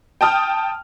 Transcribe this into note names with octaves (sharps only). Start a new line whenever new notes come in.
G5 A5 D#6 F6